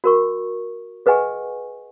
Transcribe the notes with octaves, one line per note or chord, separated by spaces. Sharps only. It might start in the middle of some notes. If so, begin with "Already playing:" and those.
F#4 A#4 C#6
G#4 B4 D#5 F#5 G#5 C#6